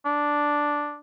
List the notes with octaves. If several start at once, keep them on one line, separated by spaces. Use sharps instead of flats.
D4